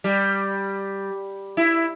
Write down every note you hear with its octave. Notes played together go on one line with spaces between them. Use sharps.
G3
E4